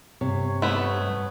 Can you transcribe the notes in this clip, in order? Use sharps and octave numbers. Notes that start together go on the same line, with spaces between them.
G2 C3 C#5
A3 B3